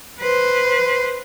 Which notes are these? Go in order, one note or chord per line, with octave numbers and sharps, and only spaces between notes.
B4 C5